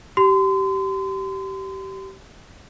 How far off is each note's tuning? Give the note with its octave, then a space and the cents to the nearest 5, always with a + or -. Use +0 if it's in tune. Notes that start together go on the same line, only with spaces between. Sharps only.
G4 -25 C6 -35